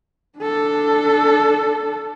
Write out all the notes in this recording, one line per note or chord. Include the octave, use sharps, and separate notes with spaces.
D4 A4